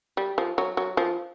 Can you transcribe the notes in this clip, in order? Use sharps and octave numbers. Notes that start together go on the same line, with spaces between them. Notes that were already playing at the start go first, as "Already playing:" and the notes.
G3
F3
F#3
F#3
F3